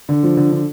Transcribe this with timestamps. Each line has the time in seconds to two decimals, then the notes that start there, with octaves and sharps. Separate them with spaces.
0.09 D3
0.23 F3
0.37 D3
0.52 D3